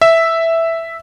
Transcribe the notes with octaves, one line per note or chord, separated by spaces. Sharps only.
E5